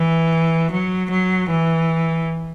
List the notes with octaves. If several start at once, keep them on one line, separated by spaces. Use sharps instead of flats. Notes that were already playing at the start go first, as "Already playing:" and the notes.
Already playing: E3
F#3
F#3
E3